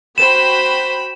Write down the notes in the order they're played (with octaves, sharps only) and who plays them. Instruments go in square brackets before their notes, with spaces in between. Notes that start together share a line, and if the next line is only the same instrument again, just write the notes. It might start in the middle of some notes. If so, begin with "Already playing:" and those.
[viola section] F#4 G5 B5 [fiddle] C5 [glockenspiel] E7